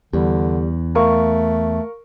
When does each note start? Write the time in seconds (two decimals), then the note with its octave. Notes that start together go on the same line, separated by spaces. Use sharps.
0.13 E2 D3 G3
0.95 A3 A#4 F5 C#6